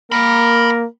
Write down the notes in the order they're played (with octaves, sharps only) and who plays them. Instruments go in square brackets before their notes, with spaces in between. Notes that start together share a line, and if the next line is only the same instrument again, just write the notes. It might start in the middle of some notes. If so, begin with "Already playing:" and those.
[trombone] A#3 [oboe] A#4 [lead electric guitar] G5 B5